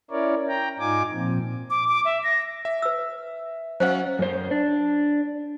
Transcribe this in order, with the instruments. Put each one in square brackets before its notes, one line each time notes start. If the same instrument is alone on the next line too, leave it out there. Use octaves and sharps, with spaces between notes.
[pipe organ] C#4 E4 A#4 C#5 D5
G5 A#5
G#2 D#4 F4 G#5 D6
A#2 F3 C4
[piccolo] D6
D6
E5
A#6
[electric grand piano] E5
[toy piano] B4 E6
[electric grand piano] F#3 C#4 F#5 [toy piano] C5 D#5 F5
[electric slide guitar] F#2 C5
D4